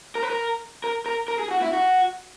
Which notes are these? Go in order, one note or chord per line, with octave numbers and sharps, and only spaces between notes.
A#4
B4
A#4
A#4
A#4
A#4
G#4
F#4
E4
F#4